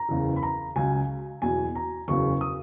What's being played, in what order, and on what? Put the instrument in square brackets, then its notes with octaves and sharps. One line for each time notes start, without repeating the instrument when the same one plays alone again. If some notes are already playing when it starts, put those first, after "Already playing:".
Already playing: [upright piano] A#5
F#1 E2 C#3 E3
B5
A#5
C#2 C#3 F#3 G#5
E2 B2 F#3 G#5
A#5
F#1 E2 C#3 F#3 C#6
D#6